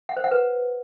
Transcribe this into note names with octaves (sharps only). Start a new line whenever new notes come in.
F#5
C5
F#5
B4